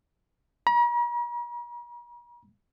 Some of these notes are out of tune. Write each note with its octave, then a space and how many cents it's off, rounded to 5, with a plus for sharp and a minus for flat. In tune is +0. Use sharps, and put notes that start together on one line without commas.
A#5 +45